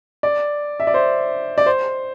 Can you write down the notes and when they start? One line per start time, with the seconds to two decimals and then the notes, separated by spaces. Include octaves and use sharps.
0.23 D5
0.80 E5
0.87 D5
0.94 C5
1.58 D5
1.66 C5